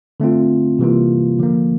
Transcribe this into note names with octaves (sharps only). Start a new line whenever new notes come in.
D3 A3 C4 F4
C3 E3 G3 A#3 F4
D3 F3 A#3